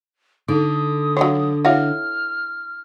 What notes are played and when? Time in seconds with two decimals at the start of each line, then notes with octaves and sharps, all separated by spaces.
0.48 D3 D#4 D#6
1.17 F#3 D4 F4 C#5
1.65 E4 F#4 C#5 E5 F5 F6